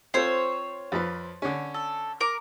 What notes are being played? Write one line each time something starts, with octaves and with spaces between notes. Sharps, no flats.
C4 F4 A4 C5 C#5
F2 F3 B4
D3 C#4
A4
A#4 D6